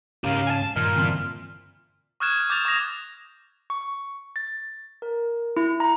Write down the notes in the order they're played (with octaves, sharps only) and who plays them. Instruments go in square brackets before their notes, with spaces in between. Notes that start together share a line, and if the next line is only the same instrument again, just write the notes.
[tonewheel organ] G#2 C#3 C#4 [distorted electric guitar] G4 A#4 [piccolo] F5
[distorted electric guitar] G#5 A5
[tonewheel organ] G2 [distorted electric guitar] A#2 [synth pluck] D#3 [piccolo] F6
[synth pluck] D3 E3 C4
[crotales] C#6 D#6 F6 F#6 G#6 E7
D6 G6 A6 F7
C#6 D#6 A#6 F7
[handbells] C#6
A6
A#4
E4
A#5